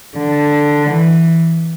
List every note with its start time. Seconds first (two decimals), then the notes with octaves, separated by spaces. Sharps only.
0.17 D3
0.90 E3